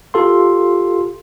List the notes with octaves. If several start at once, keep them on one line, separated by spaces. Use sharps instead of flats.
F4 G4 A4 F5 C6